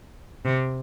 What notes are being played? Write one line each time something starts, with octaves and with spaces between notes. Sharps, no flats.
C3